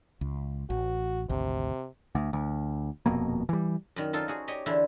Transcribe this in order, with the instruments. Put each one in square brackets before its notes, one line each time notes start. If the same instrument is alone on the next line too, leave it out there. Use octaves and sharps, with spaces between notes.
[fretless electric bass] C#2
[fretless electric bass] A1 [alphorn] F#4
[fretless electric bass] G#1 D2 [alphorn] C3
[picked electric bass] D2
D2
D#1 F2 B2 A#3
E3 G3
[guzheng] F#2 D#3
D#4 F4 A4 C5
F#4 G#4
G4 C#5 D#5
E2 D3 E4 C5